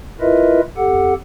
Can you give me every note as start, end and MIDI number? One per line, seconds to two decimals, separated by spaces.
0.21 0.61 64
0.21 0.61 65
0.21 0.61 70
0.21 0.61 71
0.21 0.61 75
0.21 0.61 76
0.77 1.14 41
0.77 1.14 67
0.77 1.14 69
0.77 1.14 78